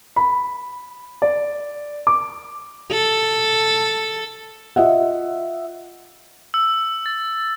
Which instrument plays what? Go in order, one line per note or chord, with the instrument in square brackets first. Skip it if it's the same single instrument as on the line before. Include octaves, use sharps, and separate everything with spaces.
[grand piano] B5
D5
D6
[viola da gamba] A4
[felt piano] F4 D#5 E5 F#5
[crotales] E6
A6